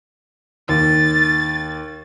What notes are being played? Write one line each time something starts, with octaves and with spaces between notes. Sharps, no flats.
D#2 A6